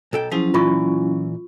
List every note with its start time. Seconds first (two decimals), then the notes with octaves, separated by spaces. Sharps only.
0.13 B1 A4 G5
0.31 F3 F#3 C#4 E4 G#4
0.54 A#2 E3 F4 C#6